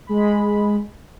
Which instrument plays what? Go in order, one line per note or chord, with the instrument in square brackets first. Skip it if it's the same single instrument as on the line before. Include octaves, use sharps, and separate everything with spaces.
[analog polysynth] G#3 B5